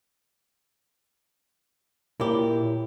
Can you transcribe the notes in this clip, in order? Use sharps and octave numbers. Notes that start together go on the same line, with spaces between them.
A#2 E4 G4 A#4 C#5